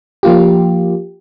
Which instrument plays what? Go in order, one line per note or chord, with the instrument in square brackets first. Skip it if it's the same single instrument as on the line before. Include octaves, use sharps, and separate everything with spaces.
[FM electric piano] F3 A#3 F4 G4